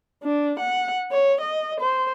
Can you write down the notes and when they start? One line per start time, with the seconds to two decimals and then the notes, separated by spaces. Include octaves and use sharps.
0.23 D4
0.59 F#5
1.12 C#5
1.41 D#5
1.80 C5